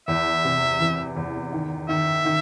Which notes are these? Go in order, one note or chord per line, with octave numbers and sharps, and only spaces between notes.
E2 E5
C3
E3
E2
D#3
D#3 E5
D#3